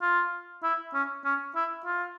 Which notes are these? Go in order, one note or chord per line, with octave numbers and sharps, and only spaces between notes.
F4
E4
C#4
C#4
E4
F4